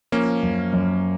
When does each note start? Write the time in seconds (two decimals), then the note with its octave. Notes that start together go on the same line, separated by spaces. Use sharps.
0.12 F3 A#3 C#4
0.43 F#2
0.73 F#2